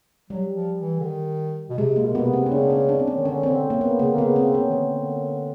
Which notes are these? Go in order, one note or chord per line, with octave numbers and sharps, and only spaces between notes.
F#3 G3
F3
E3
D3
D#3
B2
C3 G#3
A#3
B2
C3
B2 B3
C3
C4
C#4
C#3 D4
C#4
D4
C4
C#4
D#3
D3 C#4
D#3 C4
D3
A#3
B3
C#3 A#3
D3
B3
C#3
C4
C#4
D#3
D3